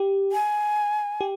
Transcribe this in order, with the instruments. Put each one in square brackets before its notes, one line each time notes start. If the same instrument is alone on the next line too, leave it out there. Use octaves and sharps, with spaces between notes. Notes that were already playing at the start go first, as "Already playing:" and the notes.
Already playing: [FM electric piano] G4
[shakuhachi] G#5
[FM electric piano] G4